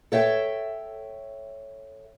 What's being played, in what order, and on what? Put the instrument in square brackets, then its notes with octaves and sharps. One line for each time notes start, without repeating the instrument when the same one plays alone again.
[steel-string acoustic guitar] A4 C#5 E5 G5